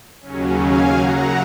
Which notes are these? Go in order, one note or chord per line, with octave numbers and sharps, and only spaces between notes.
D#2 C#3 F#3 C#4
F5 G#5
F#2 C#3 F#3 F#5 A#5